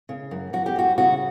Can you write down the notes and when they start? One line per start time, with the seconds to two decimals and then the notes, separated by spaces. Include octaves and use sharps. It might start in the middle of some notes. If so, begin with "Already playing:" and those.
0.09 C#3
0.31 F#2
0.53 F#2 F#4
0.66 G4
0.76 G3 F#4
0.98 C#3 F#4